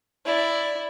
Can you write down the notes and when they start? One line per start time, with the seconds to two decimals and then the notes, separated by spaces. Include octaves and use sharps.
0.25 E4 D5